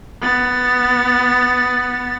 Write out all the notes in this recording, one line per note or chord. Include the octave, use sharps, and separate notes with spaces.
B3 A6